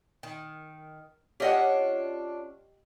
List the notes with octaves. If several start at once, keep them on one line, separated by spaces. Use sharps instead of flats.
D#3
C#4 D4 F4 G4 D#5 F#5